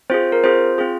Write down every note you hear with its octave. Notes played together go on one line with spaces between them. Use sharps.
C4 F4 G#4 C5
A#4
C4 F4 G#4 C5
C4 F4 G#4